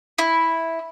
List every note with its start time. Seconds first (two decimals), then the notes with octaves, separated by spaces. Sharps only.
0.19 E4